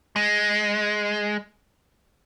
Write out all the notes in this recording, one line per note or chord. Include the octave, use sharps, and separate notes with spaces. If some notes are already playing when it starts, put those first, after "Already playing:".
G#3